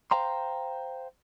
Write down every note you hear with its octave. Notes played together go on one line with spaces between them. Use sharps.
C5 F5 G5 A#5 C6